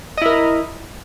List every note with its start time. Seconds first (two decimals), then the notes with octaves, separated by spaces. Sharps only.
0.17 D#5
0.22 E4
0.26 A#4